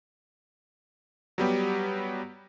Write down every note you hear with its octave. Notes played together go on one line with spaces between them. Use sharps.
F#3 G3 B3 G4